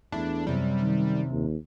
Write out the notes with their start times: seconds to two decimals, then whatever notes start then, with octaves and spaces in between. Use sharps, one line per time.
0.12 E2 A3 D4 E4
0.47 F#2 C3 G3
0.81 D#3
1.31 D#2